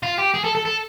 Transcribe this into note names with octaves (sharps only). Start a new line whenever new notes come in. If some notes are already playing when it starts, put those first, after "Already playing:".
F4
G4
G#4
A4
A4
A4